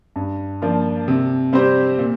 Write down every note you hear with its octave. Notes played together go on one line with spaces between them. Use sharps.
G2
F3 A#3 D4 F4
C3
G3 C4 G4 C5
A#2